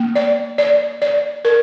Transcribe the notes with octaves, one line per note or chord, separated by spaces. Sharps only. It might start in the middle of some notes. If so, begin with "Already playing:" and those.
Already playing: A#3
D5
D5
D5
A#4